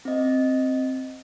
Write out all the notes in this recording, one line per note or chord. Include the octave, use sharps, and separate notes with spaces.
C4 D#5